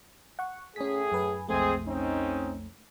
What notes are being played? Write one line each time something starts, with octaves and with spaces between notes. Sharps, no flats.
F#5 C#6
A2 C#4 G#4 B6
F#2 B4 G#5
B1 F2 G#3 A3 C4 G#4
C4 C#4 D#4